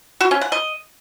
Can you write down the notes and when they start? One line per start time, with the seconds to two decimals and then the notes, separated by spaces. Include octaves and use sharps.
0.21 F#4
0.31 C#4
0.41 F#5
0.52 D#5